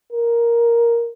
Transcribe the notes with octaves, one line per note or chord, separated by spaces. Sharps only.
A#4